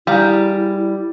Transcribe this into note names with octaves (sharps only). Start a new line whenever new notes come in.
G3 E4 G#4 F5 A#5